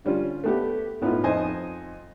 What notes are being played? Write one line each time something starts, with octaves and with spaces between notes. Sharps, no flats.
D3 G3 C#4 F4
A3 B3 G4
A2 B3 C#4 D#4 F4
F2 D#4 C5 D#5 G#5